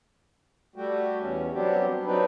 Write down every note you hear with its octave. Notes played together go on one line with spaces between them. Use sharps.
G3 A3 F#4 G4
E2 B2 C#4
F#3 G3 B3 C4 D4 G4
F#3 C4 D4 D#4 G4 B4